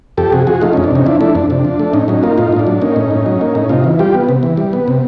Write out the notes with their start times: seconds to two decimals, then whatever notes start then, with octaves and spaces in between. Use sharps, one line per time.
0.17 F2 G4 A4
0.32 C3 F#4 G#4
0.47 F3 F#4 G#4
0.61 A3 D#4 F4
0.73 F2 C#4 D#4
0.84 D4
0.91 C3 C#4 D#4
1.06 F3 D4 E4
1.21 A3 D4 E4
1.35 F2 D4
1.50 C3 D4
1.65 F3
1.79 A3
1.93 A2 C#4 D#4
2.08 F#3 C#4 D#4
2.23 A#3 D#4 F4
2.38 A2 D#4 F4
2.52 A2 D#4
2.59 D4
2.67 F#3
2.82 A#3 C#4 D#4
2.96 A2
3.11 A2
3.26 F#3
3.41 A#3
3.55 A2
3.69 C3 D#4 F4
3.84 E3
3.99 G3 F4 G4
4.14 B3
4.29 C3
4.43 E3
4.57 G3
4.73 B3
4.88 C3